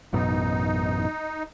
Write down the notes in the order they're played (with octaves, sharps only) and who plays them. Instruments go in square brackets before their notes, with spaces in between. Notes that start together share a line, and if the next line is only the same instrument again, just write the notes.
[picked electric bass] A1 F#2 B2 [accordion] D#4